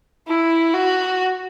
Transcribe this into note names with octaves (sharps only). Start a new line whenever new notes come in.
E4
F#4